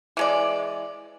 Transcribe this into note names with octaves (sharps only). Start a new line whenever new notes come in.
E3 G#3 D5